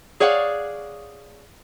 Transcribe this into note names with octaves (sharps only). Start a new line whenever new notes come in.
G#4 C#5 D5 F5 F#5